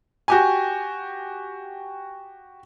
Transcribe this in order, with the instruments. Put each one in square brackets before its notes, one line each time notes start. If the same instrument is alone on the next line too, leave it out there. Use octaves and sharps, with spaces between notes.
[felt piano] F#4 G4 G#5